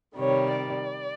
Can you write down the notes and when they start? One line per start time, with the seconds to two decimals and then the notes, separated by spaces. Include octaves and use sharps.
0.16 C3 D#3 G3 C#5
0.56 D5